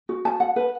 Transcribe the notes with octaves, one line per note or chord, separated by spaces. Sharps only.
F#4
A5
F#5
B4